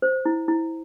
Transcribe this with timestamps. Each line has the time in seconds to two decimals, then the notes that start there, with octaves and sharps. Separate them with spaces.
0.02 C5
0.25 E4
0.48 E4